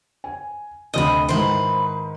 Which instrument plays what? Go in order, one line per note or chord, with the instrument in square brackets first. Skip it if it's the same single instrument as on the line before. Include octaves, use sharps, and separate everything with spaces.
[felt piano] G#5
[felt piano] D2 C3 [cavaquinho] D#5 B5
[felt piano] G#2 D#3 E4 [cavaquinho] B4 C5